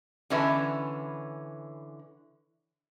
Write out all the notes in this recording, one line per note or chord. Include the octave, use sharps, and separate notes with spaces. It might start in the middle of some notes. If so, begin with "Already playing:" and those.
D3 E3 C#4 B4 E5